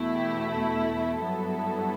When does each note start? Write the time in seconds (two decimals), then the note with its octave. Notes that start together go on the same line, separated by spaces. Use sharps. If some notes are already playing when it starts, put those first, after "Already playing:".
Already playing: E2 B2 A3 E4
0.13 G4
0.49 A4
1.21 G2 F#3 B3 E4